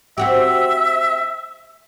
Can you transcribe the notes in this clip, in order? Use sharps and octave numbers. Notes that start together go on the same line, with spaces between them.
C4 F#4 G4 E5